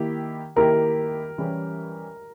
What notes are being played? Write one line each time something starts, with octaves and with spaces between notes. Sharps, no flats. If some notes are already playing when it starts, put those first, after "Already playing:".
Already playing: D#3 A#3 E4 G4
D#3 A#3 E4 G4 A#4
E3 G3 C#4 G4